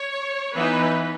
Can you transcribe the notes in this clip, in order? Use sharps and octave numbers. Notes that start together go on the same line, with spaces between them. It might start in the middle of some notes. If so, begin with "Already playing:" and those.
Already playing: C#5
E3 B3 D#4 B4